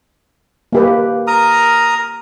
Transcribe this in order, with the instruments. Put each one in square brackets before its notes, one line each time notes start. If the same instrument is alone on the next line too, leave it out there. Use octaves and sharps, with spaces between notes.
[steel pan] A#3 G4 B4
[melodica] A#4 A#5 D#6